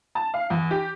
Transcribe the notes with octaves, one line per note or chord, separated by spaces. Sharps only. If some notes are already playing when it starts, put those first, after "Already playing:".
A5
F5
E2
G4